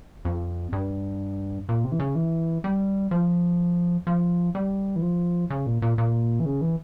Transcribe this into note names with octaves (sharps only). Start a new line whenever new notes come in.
F2
G2
A#2
C3
E3
C#3
E3
G3
F3
F3
G3
E3
F3
C#3
A#2
A#2
A#2
E3
C#3
E3